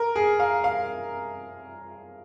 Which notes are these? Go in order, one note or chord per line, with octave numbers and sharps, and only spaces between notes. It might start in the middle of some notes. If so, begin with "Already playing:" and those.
Already playing: A#4
G#4
F5
F5